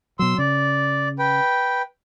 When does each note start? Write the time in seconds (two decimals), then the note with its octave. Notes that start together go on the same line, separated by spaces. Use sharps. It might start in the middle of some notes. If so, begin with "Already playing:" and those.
0.19 B2 F#3 C6 E6
0.38 C#3 D5
1.19 B4 G5